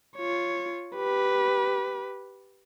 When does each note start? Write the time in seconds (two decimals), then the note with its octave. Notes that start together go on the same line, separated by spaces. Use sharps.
0.16 F4 C#5
0.96 G4 B4